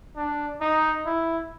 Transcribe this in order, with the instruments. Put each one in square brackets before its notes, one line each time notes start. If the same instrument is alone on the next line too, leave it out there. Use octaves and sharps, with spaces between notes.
[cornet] D4
D#4
E4